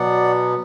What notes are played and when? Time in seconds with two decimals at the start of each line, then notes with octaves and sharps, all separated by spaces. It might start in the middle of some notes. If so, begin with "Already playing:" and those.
Already playing: B2 F#3 B3 D5 F#5